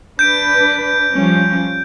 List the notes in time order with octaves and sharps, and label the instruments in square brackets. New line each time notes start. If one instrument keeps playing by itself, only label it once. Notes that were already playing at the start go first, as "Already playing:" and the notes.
[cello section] D4 B4 [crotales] G6 D7
[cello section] F3 G3 C#4